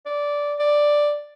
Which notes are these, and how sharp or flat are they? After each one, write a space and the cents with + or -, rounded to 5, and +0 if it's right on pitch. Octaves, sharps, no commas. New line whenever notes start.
D5 -10
D5 +5